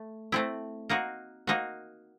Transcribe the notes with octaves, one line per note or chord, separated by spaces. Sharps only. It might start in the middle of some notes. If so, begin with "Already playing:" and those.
Already playing: A3
A3 C4 E4
A#3 D#4 F#4
A#3 D#4 F#4